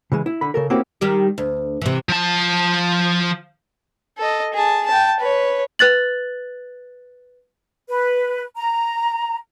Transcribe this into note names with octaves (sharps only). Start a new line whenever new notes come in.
C#3 E3 G#3
E4
D3 B5
C#3 A4 A#4
A#3 C4 C#4 E4 F#4 G4
D#3 G3 G4
D2
C3 E3
F3 A5
A4 D#5
G#4 A5
G5 A5
B4 C#5
B4 F#6 A6 F#7
B4
A#5